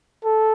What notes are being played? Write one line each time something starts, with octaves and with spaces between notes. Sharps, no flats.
A4